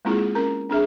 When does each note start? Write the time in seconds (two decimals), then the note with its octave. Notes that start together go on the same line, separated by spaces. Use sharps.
0.05 G#3 A#3 C4 E4 F4 G#4
0.35 C#4 A#4 A#5
0.69 C4 D4 G#4 E5